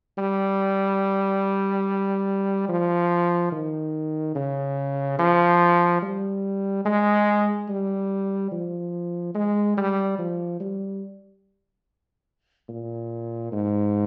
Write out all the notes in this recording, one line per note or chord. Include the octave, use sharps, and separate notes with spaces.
G3
F3
D#3
C#3
F3
G3
G#3
G3
F3
G#3
G3
F3
G3
A#2
G#2